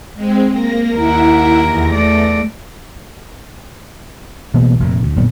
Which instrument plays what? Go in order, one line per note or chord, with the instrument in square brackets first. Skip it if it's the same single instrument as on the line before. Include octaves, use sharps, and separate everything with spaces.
[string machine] G#3 C4
A#3 A#6
[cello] D#2 A#4 [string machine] E4 F#5
[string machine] E2 A#6
[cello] A3 D5
[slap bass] B2 E3 A#3 B3
F1 F2 A#2
D2
G1 F#2 A#2 B3